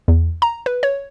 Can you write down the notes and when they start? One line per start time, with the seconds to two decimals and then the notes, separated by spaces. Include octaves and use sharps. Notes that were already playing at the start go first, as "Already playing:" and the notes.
0.08 E2
0.42 A#5
0.66 B4
0.83 C#5